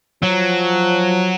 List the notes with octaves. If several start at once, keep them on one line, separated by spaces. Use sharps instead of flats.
F3 F#3